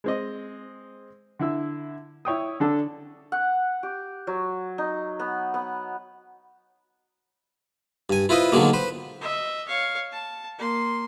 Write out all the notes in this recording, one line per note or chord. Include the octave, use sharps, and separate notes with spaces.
G#3 C4 D#5
D3 E4 E6
E4 C#5 G5 D#6
D3 D4 A4
F#5
G4
F#3
D#4
B3
B3
G2 G#5
E4 F4 B4 C5 D#5
B2 D3 D#3 F#3 G#3 A#3
B4 C5
D#5 E5
C#5 F5
A5
A#3 C6